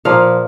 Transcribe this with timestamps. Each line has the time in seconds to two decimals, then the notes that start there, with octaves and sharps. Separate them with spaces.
0.05 A#2 F3 A#3 F5